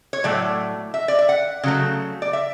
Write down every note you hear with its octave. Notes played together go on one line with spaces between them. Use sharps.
C#5
A2 F#3 A3 D5
E5
D5
E5
F#5
C#3 F#3 A3
D5
E5